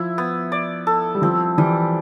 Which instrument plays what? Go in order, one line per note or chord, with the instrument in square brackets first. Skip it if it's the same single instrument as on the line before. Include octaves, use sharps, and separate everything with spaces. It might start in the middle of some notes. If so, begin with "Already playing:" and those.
Already playing: [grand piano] F3 [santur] E4
[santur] B3
D5
A4
[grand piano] G3
[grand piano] F3 [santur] C4
[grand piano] E3 [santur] G3